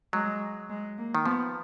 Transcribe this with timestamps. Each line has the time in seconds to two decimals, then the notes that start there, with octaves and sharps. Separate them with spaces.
0.13 F#3 G#3
0.70 G#3
0.98 A#3
1.15 D#3
1.26 F3 B3